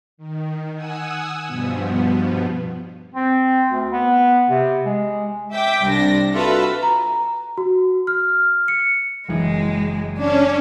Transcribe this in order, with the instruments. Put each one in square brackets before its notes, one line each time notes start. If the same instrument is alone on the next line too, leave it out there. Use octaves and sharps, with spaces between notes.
[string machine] D#3
F#5 G#5 D#6 E6
G2 B2 F3 B3
[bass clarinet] C4
D2
B3
C3
G#3
[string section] E5 G5 D6
C2 D4 A#6
F4 F#4 A4 B4 E5
[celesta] A#5
F#4
F6
C#7
[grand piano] F#1 E3 [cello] G#3
[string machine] C#4 [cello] D4